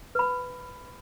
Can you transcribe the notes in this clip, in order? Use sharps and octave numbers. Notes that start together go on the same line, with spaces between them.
B4 B5